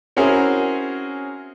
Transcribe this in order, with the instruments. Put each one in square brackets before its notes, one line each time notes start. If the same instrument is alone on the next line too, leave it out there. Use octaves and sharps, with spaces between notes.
[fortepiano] C4 C#4 E4 F#4 G#4 A#4